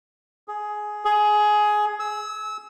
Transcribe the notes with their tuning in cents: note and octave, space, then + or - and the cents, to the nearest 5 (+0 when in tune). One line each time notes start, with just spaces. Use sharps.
G#4 +10
G#4 +15
E6 -25